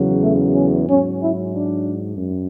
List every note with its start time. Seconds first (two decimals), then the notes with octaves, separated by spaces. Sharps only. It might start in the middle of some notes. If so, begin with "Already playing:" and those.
Already playing: E2 C#3 F#3
0.21 A3
0.54 C#4
0.86 G#2 F#3 C#4
1.19 E4
1.53 D4
2.18 F#2